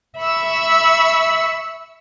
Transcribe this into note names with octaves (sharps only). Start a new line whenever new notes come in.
E5 B5 C#6 E6